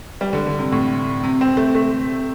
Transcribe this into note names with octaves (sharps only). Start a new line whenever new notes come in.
G3
D3
D3
C3
A2
C3
C4
A3
A3